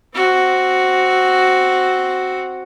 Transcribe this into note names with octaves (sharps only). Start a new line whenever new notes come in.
C4 F#4